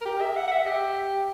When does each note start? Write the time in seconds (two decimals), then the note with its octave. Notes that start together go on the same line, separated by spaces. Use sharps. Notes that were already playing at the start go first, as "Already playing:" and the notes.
0.01 A#4
0.05 G4
0.21 E5
0.36 F#5
0.48 F#5
0.52 E5
0.67 G4